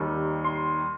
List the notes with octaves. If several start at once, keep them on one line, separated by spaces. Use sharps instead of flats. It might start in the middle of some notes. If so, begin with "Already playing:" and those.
Already playing: D#2 D#3 G3
C6